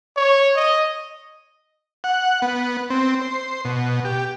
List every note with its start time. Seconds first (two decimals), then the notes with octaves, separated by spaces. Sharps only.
0.16 C#5
0.56 D#5
2.04 F#5
2.42 B3
2.90 C4
3.22 C5
3.65 B2
4.05 G4